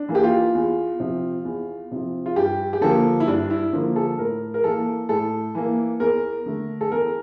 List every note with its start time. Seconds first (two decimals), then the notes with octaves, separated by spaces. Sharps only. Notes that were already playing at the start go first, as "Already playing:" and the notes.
Already playing: D4
0.09 E3 A#3
0.15 G4
0.23 F4
0.54 E2
1.00 C3 F3
1.45 E2
1.91 C3 F3
2.26 F4
2.36 G2 G4
2.73 G4
2.81 D3 F3 A#3 A4
3.20 E4
3.27 G2 D4
3.50 E4
3.73 D3 F3 A#3
3.96 A4
4.18 A2 A#4
4.54 A#4
4.63 E3 A#3 A4
5.09 A2 A4
5.55 E3 A#3
6.00 E2 A#4
6.46 D3 A3
6.81 A4
6.92 E2 A#4